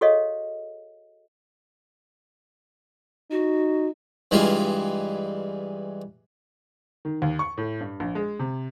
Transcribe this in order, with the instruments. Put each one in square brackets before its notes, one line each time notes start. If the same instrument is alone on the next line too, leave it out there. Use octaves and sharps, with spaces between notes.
[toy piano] F#4 G#4 A4 C#5 D#5 F5
[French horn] D#4 [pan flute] F#4
[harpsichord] G2 E3 G3 G#3 E4 F4
[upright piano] D#3
D#2
C#6
A2
G2
A#1
G#3
C3